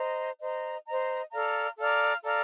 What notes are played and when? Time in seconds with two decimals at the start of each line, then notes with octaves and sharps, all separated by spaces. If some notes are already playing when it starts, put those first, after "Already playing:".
Already playing: C5 D#5 A#5
0.39 C5 D#5 A#5
0.85 C5 D#5 A#5
1.32 A4 D5 F5 A#5
1.78 A4 D5 F5 A#5
2.24 A4 D5 F5 A#5